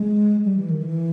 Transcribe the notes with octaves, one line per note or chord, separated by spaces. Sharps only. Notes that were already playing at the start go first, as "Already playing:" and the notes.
Already playing: G#3
G3
E3
D#3
E3